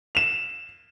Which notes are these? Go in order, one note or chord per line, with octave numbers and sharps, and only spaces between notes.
E7 F7